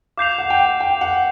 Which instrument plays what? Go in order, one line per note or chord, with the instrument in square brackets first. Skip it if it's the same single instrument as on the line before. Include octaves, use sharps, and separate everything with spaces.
[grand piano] F5 [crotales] D6 G6 C7 F7
[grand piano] F#5
G5
F#5
G5
F#5